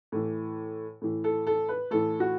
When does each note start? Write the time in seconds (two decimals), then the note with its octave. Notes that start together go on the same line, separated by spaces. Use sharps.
0.12 A2 E3
1.02 A2 E3
1.24 A4
1.47 A4
1.69 B4
1.91 A2 E3 A4
2.20 F#4